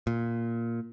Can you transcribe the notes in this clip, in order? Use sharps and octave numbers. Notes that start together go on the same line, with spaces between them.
A#2